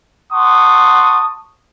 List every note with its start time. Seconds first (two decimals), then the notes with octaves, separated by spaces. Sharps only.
0.33 F#5 A5 C6 C#6 D#6